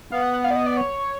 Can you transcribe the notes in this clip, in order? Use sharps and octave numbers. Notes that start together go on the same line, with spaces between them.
B3 F5
F#5
F#5
F5
D5
D#5
D5
C#5